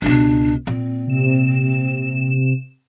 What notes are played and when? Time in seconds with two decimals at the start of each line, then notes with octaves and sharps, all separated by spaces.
0.02 C#2 B2 D4
0.67 A#2 C4
1.07 C3 E7